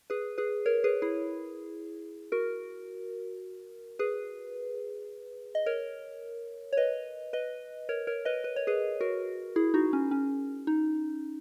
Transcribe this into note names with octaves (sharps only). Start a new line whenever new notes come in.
G#4 B4
G#4 B4
A#4 C#5
G#4 B4
E4 G#4
F#4 A#4
G#4 B4
D#5
A#4 C#5
C#5
B4 D#5
B4 D#5
A#4 C#5
A#4 C#5
B4 D#5
B4
C#5
G#4 B4
F#4 A#4
E4 G#4
D#4 F#4
C#4
C#4
D#4